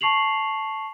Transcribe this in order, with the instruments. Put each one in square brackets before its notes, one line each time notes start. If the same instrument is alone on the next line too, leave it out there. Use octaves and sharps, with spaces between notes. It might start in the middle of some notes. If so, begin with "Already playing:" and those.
[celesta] A5 C#6 C7 F7 F#7